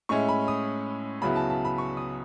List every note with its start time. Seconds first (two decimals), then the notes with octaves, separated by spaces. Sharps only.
0.09 A2 G#3 C#4 E4 C#6
0.29 B5
0.48 D#6
1.22 C#2 C#3 F#3 B3 E4 B5
1.36 A5
1.50 A5
1.65 B5
1.78 C#6
1.97 D#6